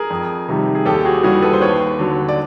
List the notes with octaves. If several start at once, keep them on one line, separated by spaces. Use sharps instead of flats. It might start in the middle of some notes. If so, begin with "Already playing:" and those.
Already playing: G#4 A#4
F2
C3 D#3 G3
G#4
D#2 G4 A4
F#4 G#4
C#3 E3 G3 F#4 G#4
A4 B4
C5
D#2 B4 C#5
D3 F#3
D5